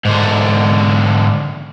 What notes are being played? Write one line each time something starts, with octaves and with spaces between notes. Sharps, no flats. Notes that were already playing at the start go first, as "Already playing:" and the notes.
G#2 D3